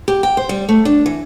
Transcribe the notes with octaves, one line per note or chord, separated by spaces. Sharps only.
G4
G5
C5
G3
A3
D4
E3